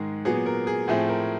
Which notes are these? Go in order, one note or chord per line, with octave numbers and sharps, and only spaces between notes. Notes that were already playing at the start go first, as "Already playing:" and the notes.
Already playing: G#2 D#3 G#3 G#4
A#2 F#3 B3 G#4
A#4
G#4
A2 F3 A3 C4 G#4
A#4